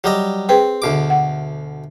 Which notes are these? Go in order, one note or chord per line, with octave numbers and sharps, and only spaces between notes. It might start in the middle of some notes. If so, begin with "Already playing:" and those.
F#3 G3 D#5
C4 G#4 B4 G5
D2 B2 D6
F#5